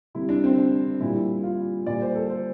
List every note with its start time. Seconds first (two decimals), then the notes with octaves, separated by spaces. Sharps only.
0.15 C3 G3 E4
0.29 D4
0.44 C4
0.58 D4
1.00 A#2 G3 E4
1.44 F4
1.86 A#2 G3 D5
2.01 C5
2.15 A4
2.30 C5